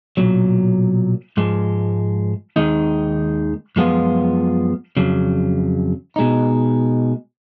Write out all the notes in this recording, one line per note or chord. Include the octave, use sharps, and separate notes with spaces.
B1 A#2 F#3
G#2 F3 G#3
D#2 D#3 G#3 D#4
F#2 F3 G#3 B3 F4
F2 C#3 F#3
B2 G#3 D#4